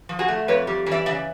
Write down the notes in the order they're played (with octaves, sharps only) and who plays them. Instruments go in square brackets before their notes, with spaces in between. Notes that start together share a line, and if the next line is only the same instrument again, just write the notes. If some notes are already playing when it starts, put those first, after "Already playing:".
[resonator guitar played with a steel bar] F3
F#4 G#4
A3
F2 B4 C#5
G3
E3
D5 E5
C#3 D5 E5